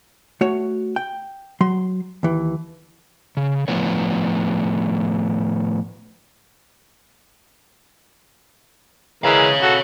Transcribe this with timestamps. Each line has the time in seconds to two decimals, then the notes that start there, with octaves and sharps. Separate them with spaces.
0.41 A3 F#4 C#5
0.96 G5
1.61 F#3 C6
2.23 D#2 E3
3.37 C#3
3.68 A2 F3 B3 C#5
9.24 E3 G#3 A#4 C#5 F5
9.62 F#4 A4